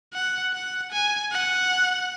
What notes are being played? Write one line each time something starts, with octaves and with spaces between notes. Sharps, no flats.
F#5
F#5
G#5
F#5